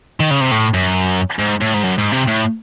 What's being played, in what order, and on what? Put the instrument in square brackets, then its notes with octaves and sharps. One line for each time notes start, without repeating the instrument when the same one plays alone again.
[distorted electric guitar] D#3
C#3
C3
A2
F#2
G#2
A2
G#2
F#2
G#2
C3
A2